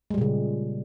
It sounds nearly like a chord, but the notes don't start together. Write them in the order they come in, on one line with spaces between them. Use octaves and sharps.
G#3 G3 A#2 C#3